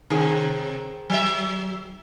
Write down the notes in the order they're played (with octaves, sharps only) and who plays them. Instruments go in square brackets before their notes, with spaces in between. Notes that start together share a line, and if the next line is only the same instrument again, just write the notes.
[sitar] C3 [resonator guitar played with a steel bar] D#3 C4 G#4
[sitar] F#3 E5